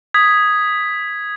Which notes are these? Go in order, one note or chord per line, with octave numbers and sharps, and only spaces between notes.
D#6 G#6 B6